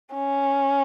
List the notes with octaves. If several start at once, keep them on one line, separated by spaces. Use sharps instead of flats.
C#4